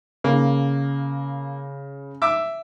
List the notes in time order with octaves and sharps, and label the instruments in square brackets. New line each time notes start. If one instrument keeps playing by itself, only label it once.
[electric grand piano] C#3 [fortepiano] A#3
[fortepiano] E5 D6 E6